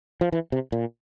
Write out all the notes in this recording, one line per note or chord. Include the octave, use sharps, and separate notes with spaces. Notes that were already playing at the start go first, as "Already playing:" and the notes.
F3
E3
C3
A#2